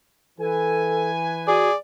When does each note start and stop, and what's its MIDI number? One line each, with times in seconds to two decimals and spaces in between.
0.39 1.77 52
0.39 1.10 69
0.39 1.77 71
0.39 1.77 80
1.47 1.69 66
1.47 1.75 68
1.47 1.76 74